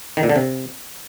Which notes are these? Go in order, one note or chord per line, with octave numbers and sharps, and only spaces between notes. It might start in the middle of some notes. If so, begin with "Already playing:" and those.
D#3
A#2
D3
C3